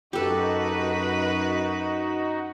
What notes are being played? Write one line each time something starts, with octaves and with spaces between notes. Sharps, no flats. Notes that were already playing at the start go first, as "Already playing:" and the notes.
F#2 D#4 F#4 G4 A4 B4